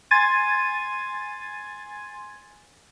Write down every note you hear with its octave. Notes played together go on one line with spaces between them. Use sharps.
G#5 C6 G#6 A6 D#7